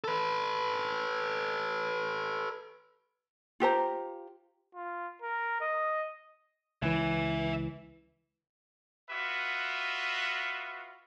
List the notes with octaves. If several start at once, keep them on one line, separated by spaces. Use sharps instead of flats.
A4 B4
F4 G4 C5 A#5
F4
A#4
D#5
C#2 E3 E5 G#5
F4 F#4 B4 D#5 E5